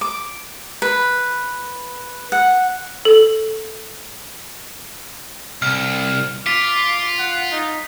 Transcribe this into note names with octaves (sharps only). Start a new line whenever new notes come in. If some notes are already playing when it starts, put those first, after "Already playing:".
D6
B4
F#5
A4
C2 F6
F4 D6 B6
F#5
D#4